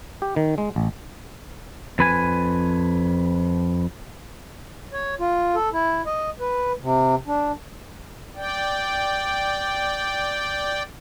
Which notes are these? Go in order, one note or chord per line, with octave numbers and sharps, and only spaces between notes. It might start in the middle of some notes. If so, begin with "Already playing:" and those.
G4
D#3
G#3
A1
F2 B4 G#5
C#5
F4
A4
E4
D#5
B4
C3
D4
D5 G5